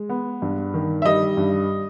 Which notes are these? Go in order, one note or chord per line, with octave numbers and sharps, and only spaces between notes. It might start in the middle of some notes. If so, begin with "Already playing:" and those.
Already playing: G#3
B3
G2
D#3
E5
G3 D#5
G2